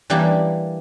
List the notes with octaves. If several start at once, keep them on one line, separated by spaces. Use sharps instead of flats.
E3 G3 A#3 D4 G4